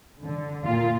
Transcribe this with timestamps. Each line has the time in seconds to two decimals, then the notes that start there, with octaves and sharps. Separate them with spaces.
0.24 D3
0.63 A#2 F4